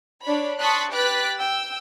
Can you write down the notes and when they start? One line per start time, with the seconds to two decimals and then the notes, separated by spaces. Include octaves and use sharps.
0.22 D4 C#5 B5
0.59 A5 C6 C#6 D#6 F#6 B6
0.91 G4 B4 D6 F#6 A6 B6
1.40 G5 E6